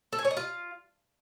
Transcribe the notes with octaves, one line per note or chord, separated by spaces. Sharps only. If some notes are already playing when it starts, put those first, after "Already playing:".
A4
G#5
C#5
D#5
F4